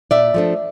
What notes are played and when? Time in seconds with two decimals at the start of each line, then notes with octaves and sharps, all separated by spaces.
0.11 A#2 D5 E5
0.34 F3 A3 D4